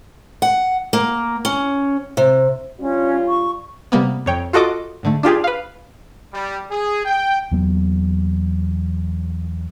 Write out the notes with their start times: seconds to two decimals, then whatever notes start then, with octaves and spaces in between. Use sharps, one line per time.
0.42 F#5
0.93 A#3
1.45 C#4
2.17 C3
2.80 G3 C#4 D4 F4
3.28 C#6
3.92 C3 G3 A#3 B3
4.26 F2 C#5 G5
4.53 F4 F#4 A4 D#5 D6
5.03 G#2 D3 A3
5.23 D4 F4 G4 G#4
5.44 B4 F5
6.33 G3
6.70 G#4
7.05 G5
7.51 E2 F#3 A#3 B3